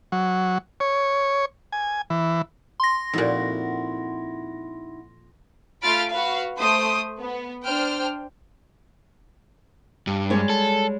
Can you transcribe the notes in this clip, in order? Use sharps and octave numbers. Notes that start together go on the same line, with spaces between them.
F#3
C#5
G#5
E3
C6 A#6
F2 A#2 D#4 E4 F#4
A3 F4 B5 F6 A6 D7
F#4 B4 F5
A3 C5 D#6
B3
D4 C5 G5 F6
G2
G3 G#3 C#5
A4